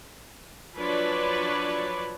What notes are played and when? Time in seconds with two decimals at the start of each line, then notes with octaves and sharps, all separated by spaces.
0.78 F3 F#3 D4 B4 C#5 D5